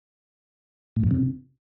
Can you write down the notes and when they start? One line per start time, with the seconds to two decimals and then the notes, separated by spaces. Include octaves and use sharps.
0.96 A2
1.04 F#2
1.11 C3